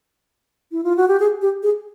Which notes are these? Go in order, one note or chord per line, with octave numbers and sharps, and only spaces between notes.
E4
F4
F#4
G4
G#4
G4
G#4